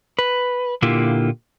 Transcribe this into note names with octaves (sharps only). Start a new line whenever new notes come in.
B4
A#2 D3 A#3 E4 F4 G4